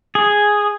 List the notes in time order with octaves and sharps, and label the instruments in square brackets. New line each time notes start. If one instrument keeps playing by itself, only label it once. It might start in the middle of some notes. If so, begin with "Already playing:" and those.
[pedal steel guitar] G#4